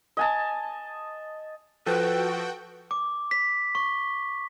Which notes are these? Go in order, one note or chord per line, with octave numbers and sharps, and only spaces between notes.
D#5 G#5 A5
F3 F#4 A4 B4 G5
D6
B6
C#6